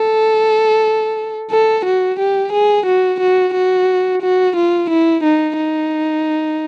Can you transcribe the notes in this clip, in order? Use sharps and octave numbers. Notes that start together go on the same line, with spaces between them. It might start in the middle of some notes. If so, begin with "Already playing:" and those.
Already playing: A4
A4
F#4
G4
G#4
F#4
F#4
F#4
F#4
F4
E4
D#4
D#4